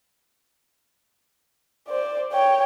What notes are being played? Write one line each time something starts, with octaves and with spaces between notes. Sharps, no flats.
C5 D5
C#5 G5